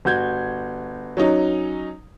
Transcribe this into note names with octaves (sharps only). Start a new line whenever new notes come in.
G1 F#4 G6 G#6
F#3 C#4 D#4